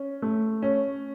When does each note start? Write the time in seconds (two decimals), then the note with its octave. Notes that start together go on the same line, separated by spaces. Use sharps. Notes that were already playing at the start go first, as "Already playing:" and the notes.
Already playing: C#4
0.22 A3
0.63 C#4